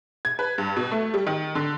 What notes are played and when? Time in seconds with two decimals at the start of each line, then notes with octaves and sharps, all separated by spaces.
0.25 G#6
0.39 B4
0.58 G2
0.77 B2
0.91 A3
1.14 G3
1.27 D#3
1.55 D3